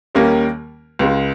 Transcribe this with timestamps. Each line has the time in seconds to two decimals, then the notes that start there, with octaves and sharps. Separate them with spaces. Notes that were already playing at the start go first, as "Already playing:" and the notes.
0.15 D#2 D#3 G3 A#3 C#4
0.99 C#2 C#3 G#3